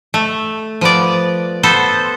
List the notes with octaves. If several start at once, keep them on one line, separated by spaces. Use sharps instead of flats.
A3
F3 B3 D5
B3 A4 C5